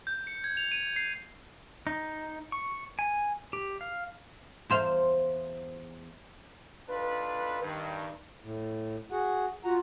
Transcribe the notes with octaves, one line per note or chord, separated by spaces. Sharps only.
G6
C#7
G#6
F7
D#7
C7
D#4
C#6
G#5
G4
F5
E2 C5 F5
D4 D#4 F4 A4 B4
G2 D#3
A2
F#4 G#4 F#5
F4 F#4 F#5 A#5